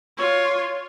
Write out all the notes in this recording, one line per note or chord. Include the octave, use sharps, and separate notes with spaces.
F4 C#5